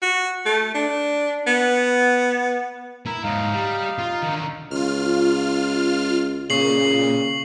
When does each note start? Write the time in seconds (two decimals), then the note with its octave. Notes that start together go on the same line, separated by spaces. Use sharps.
0.02 F#4
0.46 A3
0.74 D4
1.47 B3
3.06 E4 A#4
3.24 G#2 F#3 D#4 F5
3.53 G3
3.99 F4
4.23 D3 D#3
4.71 C#2 F4 F6
6.50 A#2 C#3 C#6 C7 F#7